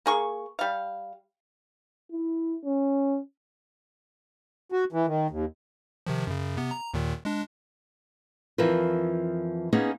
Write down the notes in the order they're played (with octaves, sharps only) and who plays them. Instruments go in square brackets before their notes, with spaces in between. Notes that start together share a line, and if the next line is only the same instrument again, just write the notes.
[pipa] A#3 G#4 C#6
G3 F5
[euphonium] E4
C#4
[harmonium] F#4
E3
D#3
D#2
[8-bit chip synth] C3 D#3 F3
F#2 C#3
C3 B3
A#5
D#2 A#2 D#3
G#3 D4
[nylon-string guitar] F2 E3 F3 F4 A#4 B4
A#3 B3 C#4 D#4 G#4